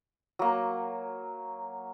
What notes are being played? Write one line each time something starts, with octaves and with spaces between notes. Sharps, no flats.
F#3 A#3